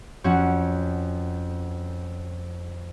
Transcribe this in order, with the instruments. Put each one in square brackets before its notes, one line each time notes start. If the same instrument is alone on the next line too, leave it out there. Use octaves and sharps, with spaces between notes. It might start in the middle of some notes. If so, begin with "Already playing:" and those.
[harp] F2 C#4 F#4 F#5